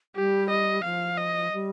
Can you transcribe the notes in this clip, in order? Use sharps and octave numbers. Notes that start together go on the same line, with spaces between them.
G3 G4
D#5
F3 F5
D#5
G3